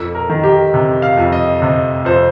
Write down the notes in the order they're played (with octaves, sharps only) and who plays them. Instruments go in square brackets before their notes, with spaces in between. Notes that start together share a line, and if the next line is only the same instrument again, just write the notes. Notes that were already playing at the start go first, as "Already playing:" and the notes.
Already playing: [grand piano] F2 A4
A#4
D#3
G4
C3
F5
F2
D#5
C3 D#5
F2 C5